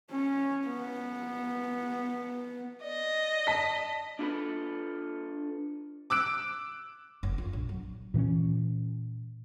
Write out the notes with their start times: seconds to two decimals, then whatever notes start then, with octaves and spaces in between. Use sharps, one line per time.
0.11 C#4
0.68 B3
2.83 D5 D#5
3.47 A5 B6
4.19 D4 E4 F4 A4 B4 B5
6.10 D6 E6 F#6 D7
7.23 F#1
7.38 F4
7.53 A#1
7.69 F#3
8.14 A#2 E3 C4 C#4